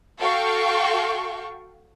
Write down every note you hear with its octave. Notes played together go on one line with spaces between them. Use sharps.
F#4 A4 F5 G5 C#6